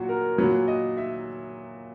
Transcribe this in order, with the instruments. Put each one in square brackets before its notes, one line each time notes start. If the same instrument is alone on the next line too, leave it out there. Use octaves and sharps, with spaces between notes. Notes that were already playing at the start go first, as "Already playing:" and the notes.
Already playing: [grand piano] A#2 F#3 F#4
A#4
F#3 B4
A#2
D#5
E5